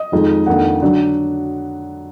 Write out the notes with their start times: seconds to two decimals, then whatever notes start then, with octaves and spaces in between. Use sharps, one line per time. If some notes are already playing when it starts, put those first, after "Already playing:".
Already playing: D#5
0.12 F2 D#3 G#3 D#4
0.46 F2 D#3 A#3 D4 F#5
0.82 D3 F#3 D4